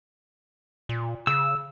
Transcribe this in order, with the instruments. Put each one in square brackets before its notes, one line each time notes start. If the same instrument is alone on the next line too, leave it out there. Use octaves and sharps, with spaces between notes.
[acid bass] A#2
[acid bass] C#3 [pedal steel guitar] E6